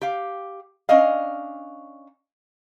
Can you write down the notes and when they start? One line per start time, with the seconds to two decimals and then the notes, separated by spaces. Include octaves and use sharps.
0.02 G4 F5
0.89 C#4 D4 D#5 F5